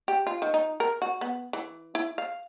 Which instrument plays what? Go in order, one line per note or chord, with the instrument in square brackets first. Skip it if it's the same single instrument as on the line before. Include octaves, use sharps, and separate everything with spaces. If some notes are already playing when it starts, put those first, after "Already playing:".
[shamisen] G4
F4
D#3
D#4
A#4
F#4
B3
E3
E4
F5